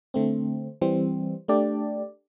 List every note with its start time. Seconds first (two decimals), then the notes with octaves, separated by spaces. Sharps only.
0.14 D3 A3 C4
0.81 E3 G3 C4
1.48 A3 D4 G4 D5